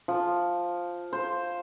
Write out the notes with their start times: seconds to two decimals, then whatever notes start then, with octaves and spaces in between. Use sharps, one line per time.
0.08 F3
1.13 C5